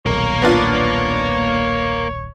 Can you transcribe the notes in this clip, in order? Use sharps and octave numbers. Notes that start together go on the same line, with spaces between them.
D#1 B1 A#3 A#4 C#5
B3 D4 F4